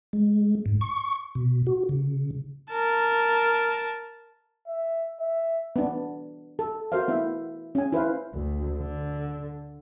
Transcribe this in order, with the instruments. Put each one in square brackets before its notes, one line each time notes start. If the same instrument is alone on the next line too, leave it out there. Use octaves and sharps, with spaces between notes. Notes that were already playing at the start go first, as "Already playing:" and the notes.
[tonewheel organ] G#3
G#2
C#6
B2
F#4
C#3
[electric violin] A#4 A5
[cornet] E5
E5
[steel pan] B3 D4
A4
F#4 A#4 C5 E5 F5
B3 E4 E5
C#4 G#5
E4 B4 C5 F5
[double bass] D2
D3